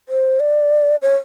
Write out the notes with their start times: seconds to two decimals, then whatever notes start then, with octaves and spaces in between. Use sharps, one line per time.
0.09 C5
0.40 D5
1.02 C#5